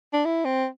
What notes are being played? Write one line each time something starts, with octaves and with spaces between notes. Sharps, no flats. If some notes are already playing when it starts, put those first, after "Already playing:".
D4
E4
C4